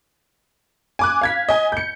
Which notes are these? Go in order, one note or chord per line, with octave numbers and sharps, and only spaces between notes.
G#5 D6 F#6
F5 G#6 B6
D#5 G#5
G6 C#7